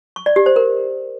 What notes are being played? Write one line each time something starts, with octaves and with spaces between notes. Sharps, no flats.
C#6
D5
G4
C5
A#4